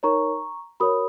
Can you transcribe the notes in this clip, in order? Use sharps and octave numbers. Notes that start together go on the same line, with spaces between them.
D#4 A#4 C#5 A#5 C#6
F#4 A#4 C#5 B5 D#6